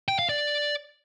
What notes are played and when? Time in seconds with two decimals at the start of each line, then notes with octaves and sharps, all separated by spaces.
0.08 G5
0.19 F5
0.29 D5